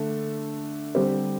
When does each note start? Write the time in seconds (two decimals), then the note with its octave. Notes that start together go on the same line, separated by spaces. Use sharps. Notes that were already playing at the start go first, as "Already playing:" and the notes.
Already playing: D3 A3 D4
0.95 D3 G3 C4 G4 C5